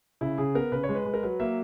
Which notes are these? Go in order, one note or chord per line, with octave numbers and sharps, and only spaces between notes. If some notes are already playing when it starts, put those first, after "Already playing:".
C#3 E4
C#3 G#4
B3 A#4
C#3 B4
C#5
G#3
B4
G#3
A#4
F#3 B4
A#3 E5